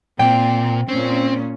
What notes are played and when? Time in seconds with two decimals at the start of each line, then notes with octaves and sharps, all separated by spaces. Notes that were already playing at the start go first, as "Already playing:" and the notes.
0.19 A#2 C4 G5
0.88 A#2 C4 C#4